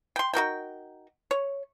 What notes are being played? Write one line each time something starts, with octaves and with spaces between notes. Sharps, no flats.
G5 C6
D#4 F#4 A#4 G5
C#5